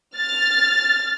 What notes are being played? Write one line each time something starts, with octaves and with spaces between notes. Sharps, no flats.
F6 A6